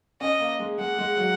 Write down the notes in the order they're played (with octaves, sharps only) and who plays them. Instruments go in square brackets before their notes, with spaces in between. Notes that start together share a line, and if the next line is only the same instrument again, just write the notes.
[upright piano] C#4 [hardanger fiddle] D#5
[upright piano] A#3
G#3
[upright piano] G#3 [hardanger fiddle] F#5
[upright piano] G#3
F#3